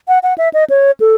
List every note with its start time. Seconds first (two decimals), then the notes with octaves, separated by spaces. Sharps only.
0.08 F#5
0.23 F#5
0.38 E5
0.54 D#5
0.70 C#5
1.00 A4